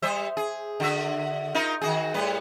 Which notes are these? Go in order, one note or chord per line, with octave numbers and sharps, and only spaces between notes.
G3 C5 E5
G#4
D3 F#4 E5
D#4 F4 A#4
D#3 F#4 G#4
A2 G3 B4